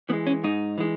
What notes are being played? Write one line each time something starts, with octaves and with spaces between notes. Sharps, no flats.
E3 G#3 B3
C#4
G#2 D#4
E3 G#3